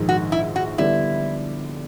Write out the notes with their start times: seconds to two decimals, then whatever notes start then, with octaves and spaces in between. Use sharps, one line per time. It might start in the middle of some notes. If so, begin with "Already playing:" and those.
Already playing: A#1 G#2 D#3
0.09 F#4
0.32 E4
0.56 F#4
0.78 D3 G3 B3 D4 E4